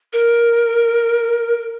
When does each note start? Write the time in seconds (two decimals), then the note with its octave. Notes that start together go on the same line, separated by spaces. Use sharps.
0.13 A#4